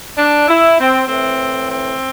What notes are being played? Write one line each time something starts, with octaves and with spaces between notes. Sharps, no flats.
D4
E4
C4
A2 E3 C4
C4